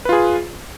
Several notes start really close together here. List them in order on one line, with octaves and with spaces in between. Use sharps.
B4 F4 G#4